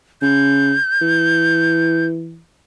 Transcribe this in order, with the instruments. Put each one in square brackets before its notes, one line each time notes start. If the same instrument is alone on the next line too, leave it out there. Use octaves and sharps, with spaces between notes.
[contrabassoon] C#3 [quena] G6
[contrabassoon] E3